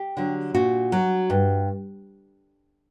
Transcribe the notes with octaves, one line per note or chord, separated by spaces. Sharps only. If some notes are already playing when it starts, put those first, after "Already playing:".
Already playing: G4
D3 F#3
A#2 F#4
F#3
G2